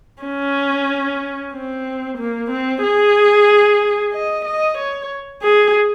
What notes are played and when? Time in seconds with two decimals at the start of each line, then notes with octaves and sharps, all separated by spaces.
0.23 C#4
1.53 C4
2.18 A#3
2.50 C4
2.83 G#4
4.12 D#5
4.45 D#5
4.78 C#5
5.42 G#4